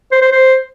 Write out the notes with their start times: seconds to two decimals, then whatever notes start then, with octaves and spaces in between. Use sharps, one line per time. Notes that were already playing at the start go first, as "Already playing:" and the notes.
0.11 C5
0.22 C5
0.32 C5